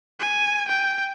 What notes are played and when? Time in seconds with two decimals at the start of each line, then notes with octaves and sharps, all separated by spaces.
0.20 G#5
0.68 G5